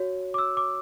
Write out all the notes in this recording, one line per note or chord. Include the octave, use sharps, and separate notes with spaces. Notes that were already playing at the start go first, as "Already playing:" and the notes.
Already playing: F#4 C#5
D6
E6
D6